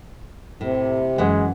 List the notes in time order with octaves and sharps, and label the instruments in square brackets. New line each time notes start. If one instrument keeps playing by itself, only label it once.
[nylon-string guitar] A2 [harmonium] C3
[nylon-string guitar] F#2 E3 F#5 [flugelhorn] G#3